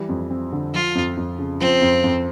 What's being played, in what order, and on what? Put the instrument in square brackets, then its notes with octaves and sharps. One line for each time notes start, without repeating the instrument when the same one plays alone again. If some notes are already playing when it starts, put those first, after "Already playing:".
Already playing: [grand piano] E3 G3
F2
C4
D3
[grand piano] F3 [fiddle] F4
[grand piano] F2
F2
C#3
[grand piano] F3 [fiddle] C4
[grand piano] F2
F2